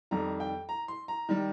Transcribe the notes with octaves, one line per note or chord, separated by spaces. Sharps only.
F2 D#3 G3 A#5
G5
A#5
C6
A#5
D#3 G3